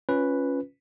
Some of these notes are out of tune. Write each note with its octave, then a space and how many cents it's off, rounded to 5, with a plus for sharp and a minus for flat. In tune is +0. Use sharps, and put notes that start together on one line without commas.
C#4 +0 F4 +0 B4 +0